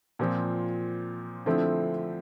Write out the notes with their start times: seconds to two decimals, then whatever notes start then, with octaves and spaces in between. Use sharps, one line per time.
0.19 A#2 F3 C4
1.46 D3 F3 A3 C4 E4